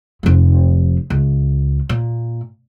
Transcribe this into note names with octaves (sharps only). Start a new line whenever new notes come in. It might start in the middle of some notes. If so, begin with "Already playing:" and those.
F1 F3
C#2
A#2